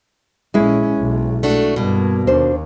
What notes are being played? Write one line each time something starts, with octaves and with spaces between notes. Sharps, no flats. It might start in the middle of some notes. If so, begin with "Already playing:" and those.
A#1 G#3 C#4 E4
B1
A3 D4 F#4
G2 B2 A#3
D#2 D4 C5